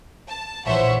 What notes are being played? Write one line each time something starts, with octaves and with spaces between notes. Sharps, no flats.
A5
A#1 E3 C5 C#5 E5 F#5